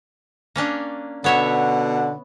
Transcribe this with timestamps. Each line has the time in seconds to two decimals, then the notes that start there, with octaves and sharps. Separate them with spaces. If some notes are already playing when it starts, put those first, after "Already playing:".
0.56 A#3 C#4 D4
1.24 B2 D3 B3 C#5 E5 F#5